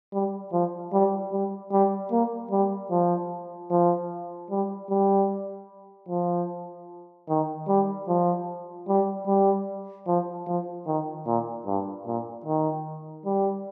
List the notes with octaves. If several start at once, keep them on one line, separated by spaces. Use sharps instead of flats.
G3
F3
G3
G3
G3
A#3
G3
F3
F3
G3
G3
F3
D#3
G3
F3
G3
G3
F3
F3
D#3
A#2
G2
A#2
D#3
G3